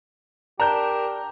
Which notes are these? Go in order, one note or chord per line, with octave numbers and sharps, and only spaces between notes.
D4 G4 A#4 A5 A#5 G6